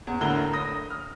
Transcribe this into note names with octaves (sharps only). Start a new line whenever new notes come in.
E2
D2 A2 D3 A#4 A#5 G7
B5 D#6 A#6
F6